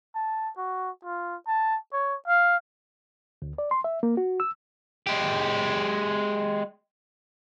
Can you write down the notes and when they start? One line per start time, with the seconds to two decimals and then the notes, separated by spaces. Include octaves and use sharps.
0.15 A5
0.57 F#4
1.04 F4
1.47 A5
1.93 C#5
2.28 F5
3.42 D2
3.58 D5
3.71 C6
3.84 E5
4.03 A#3
4.17 F#4
4.40 E6
5.07 G#3 G4